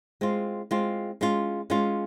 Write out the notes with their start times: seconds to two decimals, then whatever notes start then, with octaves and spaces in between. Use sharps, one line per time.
0.21 G#3 C4 F4
0.71 G#3 C4 F4
1.21 G#3 C#4 F4
1.70 G#3 C#4 F4